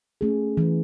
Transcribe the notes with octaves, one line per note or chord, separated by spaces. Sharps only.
A3 C#4 G#4
E3